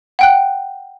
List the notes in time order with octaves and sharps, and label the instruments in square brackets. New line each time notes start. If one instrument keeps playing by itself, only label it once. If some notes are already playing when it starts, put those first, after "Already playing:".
[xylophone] F#5 G5 F#6